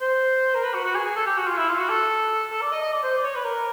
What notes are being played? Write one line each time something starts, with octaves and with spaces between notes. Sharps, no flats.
C5
A#4
B4
F#4
F#4
G#4
G#4
A4
G4
F#4
F4
E4
F4
F#4
A4
A4
D5
D#5
D#5
D5
C5
D5
C#5
B4
A#4